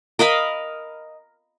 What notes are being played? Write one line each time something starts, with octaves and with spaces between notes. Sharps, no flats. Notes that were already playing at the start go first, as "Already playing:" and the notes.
A#4 D#5 F5 B5